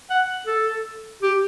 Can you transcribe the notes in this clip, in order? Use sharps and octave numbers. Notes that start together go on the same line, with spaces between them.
F#5
A4
G4